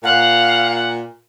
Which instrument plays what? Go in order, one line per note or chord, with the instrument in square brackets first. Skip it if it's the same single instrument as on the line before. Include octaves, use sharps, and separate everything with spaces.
[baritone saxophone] A#2 [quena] F5 [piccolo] F#5